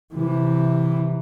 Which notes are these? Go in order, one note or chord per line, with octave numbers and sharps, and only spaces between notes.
C3 E3